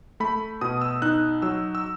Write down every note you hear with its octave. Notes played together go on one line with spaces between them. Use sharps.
A3 B5
B2 D#6
E6
D#4 F#6
F#3 E6
E6